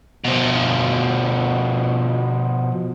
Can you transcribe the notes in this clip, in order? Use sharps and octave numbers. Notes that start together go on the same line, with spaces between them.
B2 F3